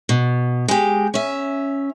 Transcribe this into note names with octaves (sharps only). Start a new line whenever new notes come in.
B2
G#3 G4
C#4 E5